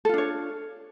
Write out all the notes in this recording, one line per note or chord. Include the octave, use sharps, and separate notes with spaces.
D4 F4 A4 C#5